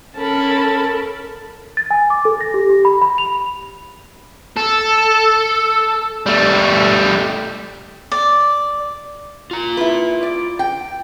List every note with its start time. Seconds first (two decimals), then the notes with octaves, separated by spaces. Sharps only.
0.17 C#4 A4 A#4 A5 B5
1.77 A6
1.91 G#5
2.10 D6
2.25 A4
2.41 A#6
2.54 G4
2.69 G4
2.85 B5
3.02 B5
3.18 F7
4.57 A4
6.26 G3 A3
8.12 D5
9.51 F4 A#5
9.77 E4 B4
10.23 D5
10.59 G5